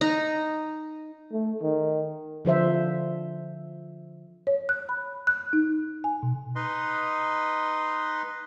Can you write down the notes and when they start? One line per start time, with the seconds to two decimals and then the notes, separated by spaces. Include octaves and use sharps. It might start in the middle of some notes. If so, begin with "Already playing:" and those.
0.01 D#4 A#5
1.33 A3
1.63 D#3
2.45 D3 F3 C5 E5
4.47 C#5
4.69 F#6
4.89 B5
5.27 F#6
5.53 D#4
6.04 G#5
6.23 B2
6.56 D#4 B4 D#5 C6